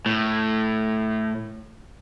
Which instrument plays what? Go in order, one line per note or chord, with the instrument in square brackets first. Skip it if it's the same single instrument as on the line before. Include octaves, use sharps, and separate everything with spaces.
[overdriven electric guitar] A2